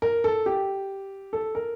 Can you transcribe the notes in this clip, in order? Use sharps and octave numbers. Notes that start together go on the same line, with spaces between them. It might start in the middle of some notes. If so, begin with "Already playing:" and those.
A#4
A4
G4
A4
A#4